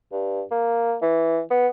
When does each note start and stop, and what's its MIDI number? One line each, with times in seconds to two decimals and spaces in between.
0.12 0.42 43
0.51 0.95 58
1.02 1.40 52
1.50 1.68 59